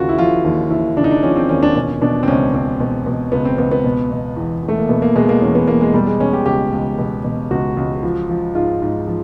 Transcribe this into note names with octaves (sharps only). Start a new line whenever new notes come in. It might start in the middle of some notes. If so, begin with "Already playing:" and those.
Already playing: D#2 C#3 F4 F#4
E4
F3 F4
D#2
D#2 E4
C#3 D4
D#4
D4
F3 C#4
C4
D#2 C#4
D4
B2 C#4
B2 D4
C4
C#2 C#4
C#2 C4
B2
B2
C#2 B3
C4
C#2 B3
B3
B2
B2
E2
E2
A3
A#3
B2 B3
A#3
B2 G#3
A#3
E2 C#4
B3
E2 A#3
G#3
B2 G3
G#3
B2 C#4
G4
C#2 G4
C#2
B2
B2
C#2 F#4
C#2
F3
F3
G#2 F4
G#2
F3